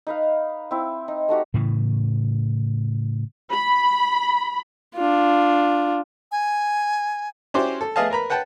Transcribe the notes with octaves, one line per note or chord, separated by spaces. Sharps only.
D#4 B4 F5
C4 E4
D#4
A3 D#4 F#4 G4
A2 C#3 E3
B5
D4 F4
G#5
C#4 E4 F#4 G4 C5 D5
A4
A3 B3 G#4 D#5 F5 A5
A#4 B4 A#5 B5
B4 F#5 G5 A5